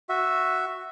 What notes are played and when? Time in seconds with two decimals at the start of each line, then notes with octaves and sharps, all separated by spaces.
0.09 F#4 E5